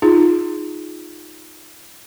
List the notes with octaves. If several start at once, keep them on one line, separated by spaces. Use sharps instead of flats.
D#4 F4 G#4